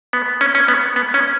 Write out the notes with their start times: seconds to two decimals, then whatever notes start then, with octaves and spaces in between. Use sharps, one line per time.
0.13 B3
0.41 C#4
0.55 C#4
0.68 B3
0.96 B3
1.14 C#4